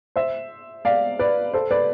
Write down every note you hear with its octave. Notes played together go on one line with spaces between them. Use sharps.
C5 E5
D5 F5
B4 D5
A4 C5
B4 D5